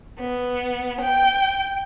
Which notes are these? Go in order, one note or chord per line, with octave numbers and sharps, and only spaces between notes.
B3
G5